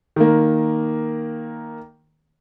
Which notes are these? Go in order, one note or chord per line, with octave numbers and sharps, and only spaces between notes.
D#3 A#3